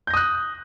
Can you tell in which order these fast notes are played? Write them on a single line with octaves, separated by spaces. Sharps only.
G6 A#6 D#6 F#6